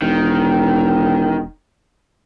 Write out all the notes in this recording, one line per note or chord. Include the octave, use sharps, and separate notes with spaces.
E1 D#3